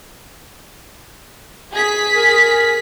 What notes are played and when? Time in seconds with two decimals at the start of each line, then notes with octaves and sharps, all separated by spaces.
1.73 G#4 B6
2.15 A#4